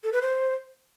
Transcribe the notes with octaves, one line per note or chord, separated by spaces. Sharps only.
A4
B4
C5